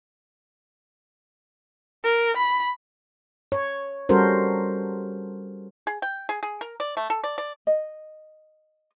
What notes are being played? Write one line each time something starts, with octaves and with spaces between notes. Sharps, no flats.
A#4
B5
C#5
G3 C#4 F#4 A4 A#4 C5
G#4
G5
G#4
G#4
A#4
D5
A3
A4
D5
D5
D#5